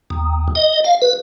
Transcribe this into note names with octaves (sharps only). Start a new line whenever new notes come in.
D#2
D#5
F5
B4